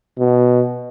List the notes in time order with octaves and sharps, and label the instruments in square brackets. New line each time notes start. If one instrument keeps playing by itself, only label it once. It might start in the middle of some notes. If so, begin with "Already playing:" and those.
[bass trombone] B2